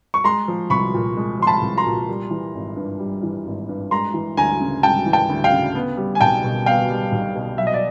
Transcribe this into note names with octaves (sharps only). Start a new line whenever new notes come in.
C#6
G#3 A#5 C6
F3
C2 B5 C#6
A#2
G#3
F3 C6
A5 B5
C2
A#5 C6
A#2
G3
E3
G#1
G2
G3
E3
G#1
G2
G#3 A#5 C6
E3
D2 G#5 A#5
C#3
G#3 G5 A5
E3
G5 A5
D2
F5 G5
C#3
B3
G3
G#5
B1 G5 A5
B2
B3 F5 G5
G3
B1
B2
F#3 E5
D#5
D5